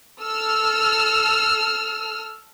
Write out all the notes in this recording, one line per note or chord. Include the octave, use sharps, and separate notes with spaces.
A4 E6 F6